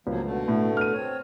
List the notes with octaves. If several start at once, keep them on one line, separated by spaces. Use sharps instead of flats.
C#2 F3 F#3 A#3
B2 D3 A3
A2
F6 D#7
C4 C#5